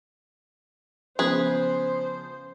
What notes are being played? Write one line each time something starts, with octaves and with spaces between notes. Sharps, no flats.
C#3 F3 B3 G#4 B4 C5